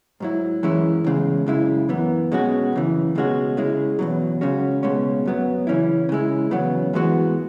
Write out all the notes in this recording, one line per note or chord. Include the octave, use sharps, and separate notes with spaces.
G#2 F#3 E4
F#2 E3 G#3 C#4 E4
E2 C#3 G#3
F#2 C#3 G#3 E4
F#2 E3 B3
B2 G#3 C#4 F#4
F#2 C#3 E3
C#2 B2 G#3 C#4 F#4
C#3 G#3 E4
E2 B2 F#3
C#3 G#3 C#4 F#4
C#2 B2 G#3 C#4
F#2 F#3 B3
C#3 E3 C#4 E4
C#3 G#3 E4
E2 C#3 F#3 B3
G#2 E3 G#3 B3 F#4